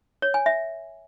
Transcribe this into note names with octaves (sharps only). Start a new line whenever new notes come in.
C#5
G#5
E5